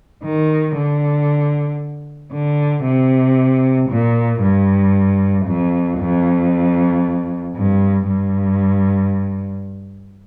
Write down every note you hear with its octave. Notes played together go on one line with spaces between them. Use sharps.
D#3
D3
D3
C3
A#2
G2
F2
F2
G2
G2